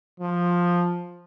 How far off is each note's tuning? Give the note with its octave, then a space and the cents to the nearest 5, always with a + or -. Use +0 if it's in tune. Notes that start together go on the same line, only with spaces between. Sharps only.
F3 +5